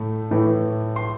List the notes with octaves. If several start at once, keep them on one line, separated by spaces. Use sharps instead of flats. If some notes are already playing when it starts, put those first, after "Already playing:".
Already playing: A2 A3
A2 E3 A3
C6